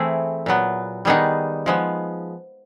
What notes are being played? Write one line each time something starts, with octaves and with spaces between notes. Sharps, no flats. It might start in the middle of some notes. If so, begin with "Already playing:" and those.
Already playing: E3 A3 C4 E4 G#4
A#2 F#3 B3
D#3 G3 B3 D#4 G#4
F3 G#3 B3